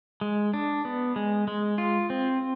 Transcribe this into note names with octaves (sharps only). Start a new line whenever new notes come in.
G#3
D4
B3
G#3
G#3
F4
C4